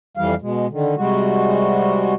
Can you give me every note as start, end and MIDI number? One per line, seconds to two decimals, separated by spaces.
0.17 0.34 41
0.17 0.34 52
0.17 0.34 55
0.17 0.34 77
0.42 0.67 47
0.42 0.67 56
0.71 0.95 50
0.71 0.95 51
0.97 2.14 48
0.97 2.14 55
0.97 2.14 56
0.97 2.14 66